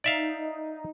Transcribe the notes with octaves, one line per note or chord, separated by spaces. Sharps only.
D#4 D5 E5 F5